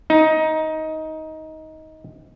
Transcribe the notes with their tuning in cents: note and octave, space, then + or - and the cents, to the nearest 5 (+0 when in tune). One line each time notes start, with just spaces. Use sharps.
D#4 +15